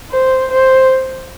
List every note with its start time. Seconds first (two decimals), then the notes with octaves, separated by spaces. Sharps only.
0.11 C5
0.51 C5